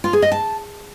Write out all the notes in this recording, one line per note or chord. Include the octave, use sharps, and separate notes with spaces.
F4
G#4
D#5
A5